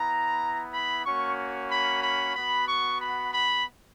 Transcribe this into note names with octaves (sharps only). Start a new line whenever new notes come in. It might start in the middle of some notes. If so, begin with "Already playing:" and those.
Already playing: B3 E4 A#5
B5
A#3 C#4 F#4 C#6
B5
B5
B3 F#4 B5
C#6
B5
B5